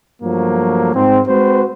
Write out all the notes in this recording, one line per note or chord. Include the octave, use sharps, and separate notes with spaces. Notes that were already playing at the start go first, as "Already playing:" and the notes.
G2 F3 F#3 A3 A#3
G#2 C4
G#3 C4 F#4 B4 C5